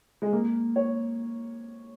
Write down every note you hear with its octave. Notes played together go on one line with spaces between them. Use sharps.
G#3
A#3
C#5